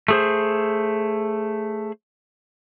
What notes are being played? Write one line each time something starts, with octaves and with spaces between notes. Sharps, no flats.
A3 G#4 C5